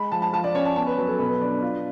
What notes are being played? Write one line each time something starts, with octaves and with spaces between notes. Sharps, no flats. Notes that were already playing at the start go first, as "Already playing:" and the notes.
Already playing: G#3 B5
F3 A5
A5
F4 A5
D5
C#4 C#5
A5
B3 A5
B4
F#3
A4
B2 B4
D4
F4